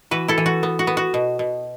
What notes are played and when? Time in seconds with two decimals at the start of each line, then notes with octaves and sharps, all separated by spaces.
0.11 E3 F#4 B4
0.28 E4 A4
0.38 E3
0.46 F#4
0.63 B3
0.79 F#4
0.87 B3
0.97 F#4
1.14 B2
1.39 B2